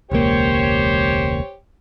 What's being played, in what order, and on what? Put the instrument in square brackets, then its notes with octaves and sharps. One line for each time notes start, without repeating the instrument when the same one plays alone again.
[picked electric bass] E1 C#2 A#3 [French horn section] G4 C5 C#5